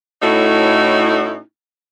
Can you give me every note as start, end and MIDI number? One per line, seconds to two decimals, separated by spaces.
0.22 1.38 45
0.22 1.38 57
0.22 1.38 61
0.22 1.38 63
0.22 1.38 64
0.22 1.38 66